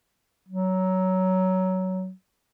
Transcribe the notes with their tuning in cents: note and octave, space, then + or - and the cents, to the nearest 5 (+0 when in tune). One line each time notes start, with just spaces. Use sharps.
F#3 +15